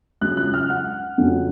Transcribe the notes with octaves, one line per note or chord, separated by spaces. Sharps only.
C#2 C#3 F#3 F#6
F#6
F6
F#5
F2 C#3 F#3